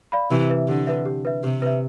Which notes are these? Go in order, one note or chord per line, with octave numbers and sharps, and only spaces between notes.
D5 F5 B5
C3 E3 G4
B4 E5
D3 G4
B4 E5
G4
B4 E5
C3 G4
B4 E5